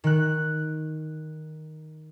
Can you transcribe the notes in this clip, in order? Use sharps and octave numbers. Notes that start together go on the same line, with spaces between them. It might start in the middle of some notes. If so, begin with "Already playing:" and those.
D#3 F#6